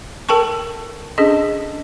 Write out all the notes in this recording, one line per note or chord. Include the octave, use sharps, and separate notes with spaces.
A4 A#4 G5 A5 C#6
C#4 D4 G#4 A4 D#5